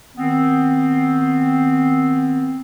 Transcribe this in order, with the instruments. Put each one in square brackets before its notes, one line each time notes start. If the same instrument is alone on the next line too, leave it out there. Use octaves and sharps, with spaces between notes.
[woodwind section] D#3 B3 C4